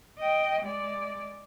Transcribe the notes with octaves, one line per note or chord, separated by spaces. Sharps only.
D#5 G5
G#3 D5